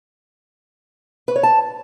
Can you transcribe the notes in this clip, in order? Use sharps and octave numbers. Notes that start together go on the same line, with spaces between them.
B4
C#5
A5